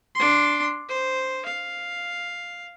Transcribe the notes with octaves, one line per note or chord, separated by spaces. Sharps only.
D4 C6
C5
F5